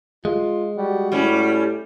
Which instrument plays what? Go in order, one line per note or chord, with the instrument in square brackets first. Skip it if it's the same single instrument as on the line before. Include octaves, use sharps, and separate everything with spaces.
[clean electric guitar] G#3 [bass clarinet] F4
[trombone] G3 [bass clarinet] F#4
[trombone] A2 [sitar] G3 C#4